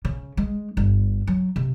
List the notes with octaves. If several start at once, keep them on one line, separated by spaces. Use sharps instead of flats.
C#3
G#3
G1
F#3
C3